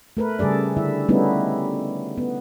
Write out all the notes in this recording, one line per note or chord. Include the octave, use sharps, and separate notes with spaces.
A3 A#4 B4
C#3 G3 G#4 A4 D5
D3 E4 E5
G3 A3 B3 C#4 D#4 E4
B3